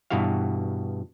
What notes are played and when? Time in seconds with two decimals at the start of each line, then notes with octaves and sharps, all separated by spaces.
0.10 G2 B2 E3 F#4 F5